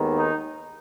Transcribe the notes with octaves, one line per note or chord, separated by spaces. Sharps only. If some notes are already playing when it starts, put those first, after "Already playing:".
Already playing: D#2 D#3 G#3 B3
D#4